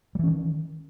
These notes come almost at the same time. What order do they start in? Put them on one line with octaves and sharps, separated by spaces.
G3 E3 C#4 D#3